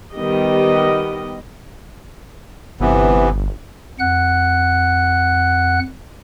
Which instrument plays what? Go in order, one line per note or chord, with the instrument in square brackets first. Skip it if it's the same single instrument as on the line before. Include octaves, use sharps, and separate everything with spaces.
[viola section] D#3 G3 B3 G4 D#5
[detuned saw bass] G1 [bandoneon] C3 E3 B3
[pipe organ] F2 F#5 F#6